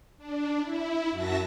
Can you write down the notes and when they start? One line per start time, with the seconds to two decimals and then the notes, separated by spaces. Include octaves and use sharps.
0.18 D4
0.61 E4
1.10 F#2 F#3 E5 A5 A#6